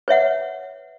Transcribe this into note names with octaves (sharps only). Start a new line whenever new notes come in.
B4 C#5 E5 F#5